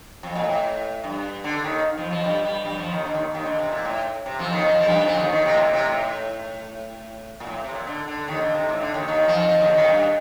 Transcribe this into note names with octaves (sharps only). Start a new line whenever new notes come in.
F2
A#2
A2
G2
D3
D#2 D#3
F2 F3
F2 F3
G2 G3
G2 G3
G2 G3
F2 F3
D#2 D#3
D3
D#2 D#3
D#2 D#3
D3
C3
A#2
A2
C3
F2 F3
D#2 D#3
F2 F3
F3
G2 G3
F2 F3
D3
D#2 D#3
D#2 D#3
C3
A2
A#2
C3
A2
A#2
A2
C3
A#2
D3
D3
D#2 D#3
D3
C3
A2
D3
D#2 D#3
D#2 D#3
F2 F3
F2 F3
D#2 D#3
D3
D#2 D#3
G2